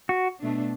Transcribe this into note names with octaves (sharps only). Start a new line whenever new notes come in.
F#4
B2 A3 D4